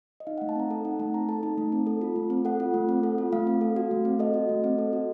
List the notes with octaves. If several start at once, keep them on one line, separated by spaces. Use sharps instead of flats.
D#5
D#4 F5
A3 F#5
A5
C4 A#5
A4 A5
D#4 F#5
A3 A5
C4 A#5
A4 A5
D#4 A5
A3
C4
A4
F4
A3
C4
A4 F#5
F4
A3
C4
A4
F4
A3 F5
C4
A4
F#4
A3
C4
A4 D#5
F#4
A3
C4
A4
F#4